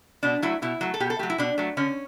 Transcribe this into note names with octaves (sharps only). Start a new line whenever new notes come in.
B2 D4
F#3 A3 E4
B2 E4
F#3 A3
A4
B2 G4
A4
F#3 A3 G4
E4
B2 D4
F#3 A3
D3 C#4